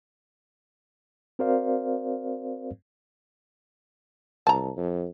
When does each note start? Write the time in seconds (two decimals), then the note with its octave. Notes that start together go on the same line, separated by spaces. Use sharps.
1.39 C4 F#4 A#4 C5 D5 F5
4.47 C2 A5 A#5
4.77 F2